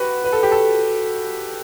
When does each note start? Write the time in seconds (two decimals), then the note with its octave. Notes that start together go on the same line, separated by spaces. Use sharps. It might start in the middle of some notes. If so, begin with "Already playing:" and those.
Already playing: F#4 G4 B4
0.24 B4
0.33 A4
0.43 G4
0.52 A4